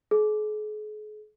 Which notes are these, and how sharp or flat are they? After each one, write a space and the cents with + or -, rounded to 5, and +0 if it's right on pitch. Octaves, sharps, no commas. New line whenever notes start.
G#4 +40